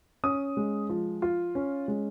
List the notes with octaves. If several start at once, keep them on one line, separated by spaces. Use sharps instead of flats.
C#4 D#6
G#3
F3
F4
C#4
G#3